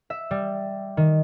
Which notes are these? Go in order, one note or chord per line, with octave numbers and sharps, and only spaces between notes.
E5
G3
D#3